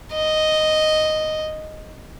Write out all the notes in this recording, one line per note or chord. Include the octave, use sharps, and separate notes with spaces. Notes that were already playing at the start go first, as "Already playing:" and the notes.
D#5